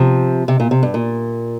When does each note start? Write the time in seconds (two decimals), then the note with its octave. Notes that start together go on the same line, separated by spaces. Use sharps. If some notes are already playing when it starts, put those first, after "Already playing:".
Already playing: C3 F3
0.48 C3
0.60 A#2
0.71 C3
0.83 G2
0.94 A#2